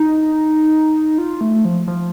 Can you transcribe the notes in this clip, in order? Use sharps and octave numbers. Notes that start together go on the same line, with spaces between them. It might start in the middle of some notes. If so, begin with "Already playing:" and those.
Already playing: D#4
F4
A3
F3
F3